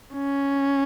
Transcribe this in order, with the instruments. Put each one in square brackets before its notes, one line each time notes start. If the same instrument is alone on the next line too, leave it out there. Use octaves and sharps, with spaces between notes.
[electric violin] C#4